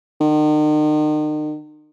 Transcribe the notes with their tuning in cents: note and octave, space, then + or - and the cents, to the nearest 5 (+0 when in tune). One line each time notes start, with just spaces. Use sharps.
D#3 -40